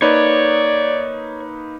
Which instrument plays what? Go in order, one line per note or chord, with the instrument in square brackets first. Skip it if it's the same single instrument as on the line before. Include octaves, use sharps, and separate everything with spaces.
[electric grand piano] A#3 D#4 B4 [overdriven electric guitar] C#5 [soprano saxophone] D5